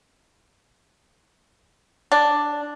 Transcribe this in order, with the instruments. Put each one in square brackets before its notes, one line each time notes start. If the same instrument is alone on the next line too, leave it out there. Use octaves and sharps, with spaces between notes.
[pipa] D4